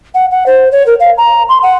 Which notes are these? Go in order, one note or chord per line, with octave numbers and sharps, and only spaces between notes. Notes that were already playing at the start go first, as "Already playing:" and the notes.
F#5
F#5
C5
C#5
A#4
F5
A#5
C6
F#5